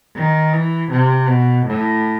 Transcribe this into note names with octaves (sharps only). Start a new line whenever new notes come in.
D#3
E3
C3
B2
A2